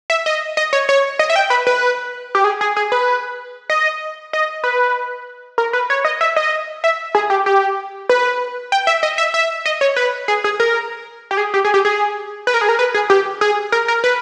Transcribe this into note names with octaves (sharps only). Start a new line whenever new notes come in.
E5
D#5
D#5
C#5
C#5
D#5
E5
G5
B4
B4
G4
G#4
G#4
G#4
B4
D#5
D#5
B4
A#4
B4
C#5
D#5
E5
D#5
E5
G#4
G4
G4
B4
G5
E5
D#5
E5
E5
D#5
C#5
B4
G#4
G#4
A#4
G4
G#4
G4
G#4
G4
G#4
B4
A#4
G#4
A#4
B4
G#4
G4
G#4
A#4
A#4
B4